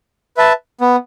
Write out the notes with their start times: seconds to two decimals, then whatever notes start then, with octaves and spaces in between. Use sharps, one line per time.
0.37 B4 E5 A5
0.81 B3